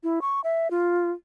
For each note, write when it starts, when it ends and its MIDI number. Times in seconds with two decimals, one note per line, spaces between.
0.03 0.19 64
0.21 0.41 85
0.44 0.70 76
0.71 1.11 65